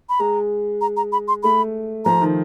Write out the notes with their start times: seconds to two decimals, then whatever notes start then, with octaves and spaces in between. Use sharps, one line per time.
0.09 B5
0.19 G#3 A#5
0.81 A#5
0.97 A#5
1.12 B5
1.28 C6
1.43 A3 B5
2.05 F3 A#5
2.22 D#3